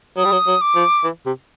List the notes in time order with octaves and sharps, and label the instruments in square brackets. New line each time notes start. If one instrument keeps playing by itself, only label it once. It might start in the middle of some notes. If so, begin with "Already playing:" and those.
[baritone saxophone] F#3 [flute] D#6
[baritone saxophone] G3
F#3
F#3
[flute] D6
[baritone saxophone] F3
E3
C3